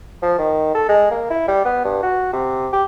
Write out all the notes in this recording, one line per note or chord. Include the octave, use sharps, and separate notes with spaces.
F3
D#3
A4
G#3
A#3
E4
G3
B3
G2
F#4
C3
G4